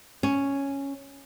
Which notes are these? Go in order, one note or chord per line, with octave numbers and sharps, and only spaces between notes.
C#4